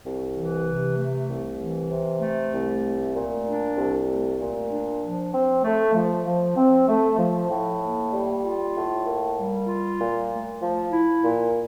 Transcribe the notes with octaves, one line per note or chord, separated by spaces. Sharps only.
C2
E3
C3
A3
C2
E3
C3
A3
C2
A3
A#2
D4
C2
A3
A#2
D4
F3
C4
A3
F3
F3
C4
A3
F3
A2
A#3
G3
F4
A2
A#3
G3
F4
A#2
A3
F3
E4
A#2